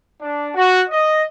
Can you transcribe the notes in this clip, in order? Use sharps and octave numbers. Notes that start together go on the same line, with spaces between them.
D4
F#4
D#5